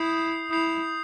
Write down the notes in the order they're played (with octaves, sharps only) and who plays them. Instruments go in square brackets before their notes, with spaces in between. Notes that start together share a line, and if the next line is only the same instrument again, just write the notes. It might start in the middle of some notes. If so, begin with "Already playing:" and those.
Already playing: [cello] E4 [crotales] D#6 G6 C7 F7
[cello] E4 [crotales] D#6 G6 C7 F7